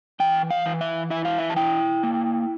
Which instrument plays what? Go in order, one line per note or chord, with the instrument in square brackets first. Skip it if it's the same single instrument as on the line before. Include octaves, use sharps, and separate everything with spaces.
[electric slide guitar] E3 G5
F5
E3
E5
E4 E5
F5
E5
A5
E4 G5
A#3